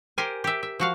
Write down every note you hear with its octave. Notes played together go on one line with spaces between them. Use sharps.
G4 A#4 C5 G#5
G4 E5
E5
F3 F#4 F5